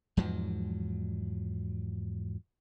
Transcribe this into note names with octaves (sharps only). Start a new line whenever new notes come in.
E2 G#2 F3 F#3